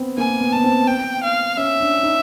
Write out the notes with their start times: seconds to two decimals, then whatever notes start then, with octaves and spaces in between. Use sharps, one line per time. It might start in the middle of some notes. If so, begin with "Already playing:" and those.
Already playing: B3 C4
0.18 A#3 G#5
0.41 B3
0.53 B3 A5
0.64 C4
0.87 G5
1.23 F5
1.57 C#4 E5
1.80 D4
2.03 D#4